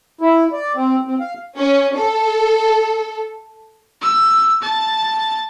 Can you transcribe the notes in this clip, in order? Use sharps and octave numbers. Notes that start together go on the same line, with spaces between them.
E4
D5
C4
C4
F5
C#4
A4
E6
A5